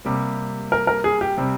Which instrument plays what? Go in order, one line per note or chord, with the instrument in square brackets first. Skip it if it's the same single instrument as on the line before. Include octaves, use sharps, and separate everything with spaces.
[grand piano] C3 G3 A#3
[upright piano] A#4
A#4
G#4
G4
[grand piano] C3 G3 C4